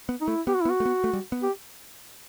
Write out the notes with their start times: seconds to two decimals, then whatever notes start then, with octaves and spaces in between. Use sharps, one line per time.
0.09 B3
0.21 D#4
0.28 A3 E4
0.47 B3 G4
0.55 F#4
0.62 E4
0.65 B3
0.69 F#4
0.80 A3
0.86 B3
1.04 A3
1.13 G3
1.32 B3
1.42 G4